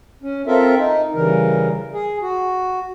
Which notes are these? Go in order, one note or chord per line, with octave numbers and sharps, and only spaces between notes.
C#4
C4 F4 A4 A#4 E5
D#4
C#3 E3 G3 A#4
G#4
F#4